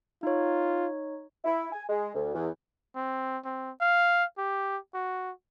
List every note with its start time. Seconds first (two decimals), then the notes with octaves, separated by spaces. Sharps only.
0.23 D#4 F4 C#5
1.45 E4
1.73 G#5
1.89 G#3
2.15 D2
2.34 E2
2.95 C4
3.44 C4
3.81 F5
4.38 G4
4.94 F#4